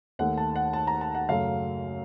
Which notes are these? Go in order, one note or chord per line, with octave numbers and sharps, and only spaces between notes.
D#2 D#3 A3 F#5
A5
F#5
A5
A#5
A5
F#5
F#2 C#3 F#3 A3 F5